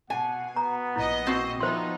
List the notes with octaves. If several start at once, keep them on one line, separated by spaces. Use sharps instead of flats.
B2 F#5 G#5
B3 A#5
A#1 E4 D#5
C4 F#4
F3 B3 D#4 E4 C5 C6